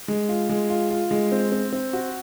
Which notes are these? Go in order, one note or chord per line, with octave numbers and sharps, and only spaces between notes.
G#3
F4
G#3
F4
F4
G#3
C4
C4
C4
F#4